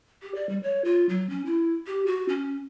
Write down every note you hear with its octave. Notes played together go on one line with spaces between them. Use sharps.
G4
D5
G3
C#5
F4
F#3
C#4
E4
G4
F#4
C#4